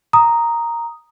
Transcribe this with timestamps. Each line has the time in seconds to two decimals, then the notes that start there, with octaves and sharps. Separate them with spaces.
0.13 A#5 D#6